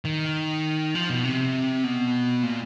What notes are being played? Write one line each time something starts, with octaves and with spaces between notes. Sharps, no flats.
D#3
F3
B2
C3
B2
A#2